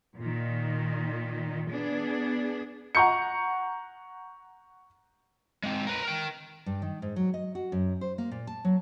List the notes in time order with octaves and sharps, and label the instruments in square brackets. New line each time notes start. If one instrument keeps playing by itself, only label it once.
[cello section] A#2 D#3
B3 D4 G#4
[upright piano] F#5 A#5 C#6 G6 C#7
[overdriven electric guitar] G#3 C4
A#4 B4
A#4 G5
[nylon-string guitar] G2
D#3
G#2
F#3
D#5
F#4
F#2
C5
A#3
A#2
A5
F#3